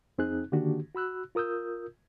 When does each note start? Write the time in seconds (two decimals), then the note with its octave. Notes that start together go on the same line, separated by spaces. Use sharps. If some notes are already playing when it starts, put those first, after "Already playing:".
0.18 F2 C4 D#4 G#4 F#6
0.52 D3 D#3 A#3 D4 F#4 G4
0.95 F#4 B5 E6 F#6
1.35 F4 A#4 D#6 E6 G6